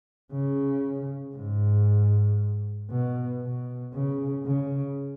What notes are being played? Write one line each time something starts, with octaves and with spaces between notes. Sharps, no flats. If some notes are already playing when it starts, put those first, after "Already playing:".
C#3
G#2
B2
B2
C#3
C#3